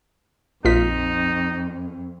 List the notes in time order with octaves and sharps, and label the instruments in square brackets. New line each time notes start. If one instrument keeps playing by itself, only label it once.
[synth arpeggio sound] A#1 F4 B6 [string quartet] F2 [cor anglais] D#4